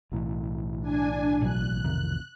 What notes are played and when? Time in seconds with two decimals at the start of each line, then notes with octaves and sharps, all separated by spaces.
0.12 B1 A2 E3
0.81 D4 G#5
1.42 A1 B2 F#3 F#6
1.84 F2 C3 D#3